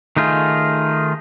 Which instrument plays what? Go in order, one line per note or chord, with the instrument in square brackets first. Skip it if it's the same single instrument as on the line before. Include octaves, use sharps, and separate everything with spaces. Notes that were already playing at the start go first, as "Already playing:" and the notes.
[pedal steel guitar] D#3 A3 D#4 F4 G#4